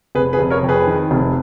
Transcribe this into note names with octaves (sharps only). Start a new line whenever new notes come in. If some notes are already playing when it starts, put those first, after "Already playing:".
F1 G#4 B4
G#4 B4
F1
A#4 C#5
F2
G#4 B4
D#3
F1